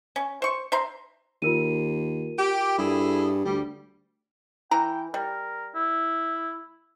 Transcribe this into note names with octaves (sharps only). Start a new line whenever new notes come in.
C#4
C5 C#6
C5 E5 A#5 C6
D#2 F4 A#4 D#7
G4
G2 E4 G#4 A4
D2 G3
E3 G5 A#5
G3 A#4
E4